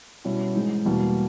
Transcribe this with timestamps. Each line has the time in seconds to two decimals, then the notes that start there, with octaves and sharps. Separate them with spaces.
0.25 B2 G3 C#4 E4
0.55 G#2 E3 G#3 D#4
0.85 E2 B2 G3 A#3